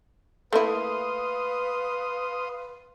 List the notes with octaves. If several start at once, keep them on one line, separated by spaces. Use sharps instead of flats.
A3 A#3 E4 B4 F5 C6 D#6